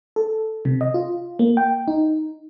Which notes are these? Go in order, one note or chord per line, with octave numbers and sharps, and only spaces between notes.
A4
C3
D#5
F4
A#3
G5
D#4